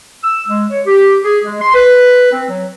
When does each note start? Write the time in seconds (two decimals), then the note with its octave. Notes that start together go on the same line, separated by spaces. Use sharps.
0.23 E6
0.48 G#3
0.70 C#5
0.86 G4
1.24 G#4
1.44 G#3
1.62 C6
1.74 B4
2.32 C4
2.50 F#3